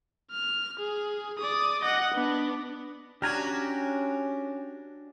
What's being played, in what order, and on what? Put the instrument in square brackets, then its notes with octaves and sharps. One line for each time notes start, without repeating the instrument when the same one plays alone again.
[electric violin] F6
G#4
D5 D#6
D#5 F#5
B3 D4
[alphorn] C#4 [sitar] D4 F#4 [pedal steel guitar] G4 A#5 [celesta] F6 G#6 D#7